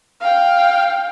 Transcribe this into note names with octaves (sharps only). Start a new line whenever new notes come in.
F5 G5